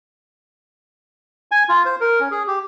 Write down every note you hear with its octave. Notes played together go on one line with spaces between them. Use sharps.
G#5
F4
C5
A#4
C#4
G#4
G4